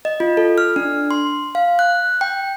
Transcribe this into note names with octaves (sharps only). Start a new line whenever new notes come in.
D#5
F4
A4
F6
D4
C6
F5
F#6
G5